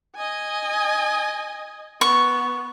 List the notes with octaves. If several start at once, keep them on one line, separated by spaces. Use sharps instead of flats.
D#5 G#5
B3 C#6